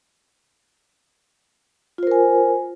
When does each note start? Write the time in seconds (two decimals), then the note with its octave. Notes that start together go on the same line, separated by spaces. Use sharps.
1.98 F4
2.03 C5
2.07 A#4
2.11 G#5